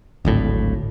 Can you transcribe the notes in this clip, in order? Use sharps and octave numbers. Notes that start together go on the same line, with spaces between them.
D1 G#1 A2